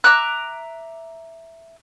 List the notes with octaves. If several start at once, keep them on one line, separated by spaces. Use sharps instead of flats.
E5 A#5 D6 F#6